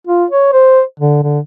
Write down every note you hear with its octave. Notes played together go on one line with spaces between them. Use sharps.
F4
C#5
C5
D3
D3